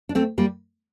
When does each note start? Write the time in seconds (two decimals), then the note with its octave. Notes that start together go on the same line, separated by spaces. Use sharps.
0.09 D4
0.15 A3 C4
0.38 G3 A#3